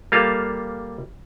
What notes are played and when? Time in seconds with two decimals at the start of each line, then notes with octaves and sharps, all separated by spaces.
0.12 G3 A#3 F4 A4 F5